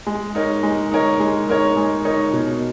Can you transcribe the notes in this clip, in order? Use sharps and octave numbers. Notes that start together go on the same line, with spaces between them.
G#3
D#4 A#4 C#5
G#3
D#4 A#4 C#5
G#3
D#4 A#4 C#5
G#3
D#4 A#4 C#5
B2